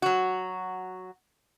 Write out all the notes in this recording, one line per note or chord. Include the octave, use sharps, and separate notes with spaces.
F#3 F#4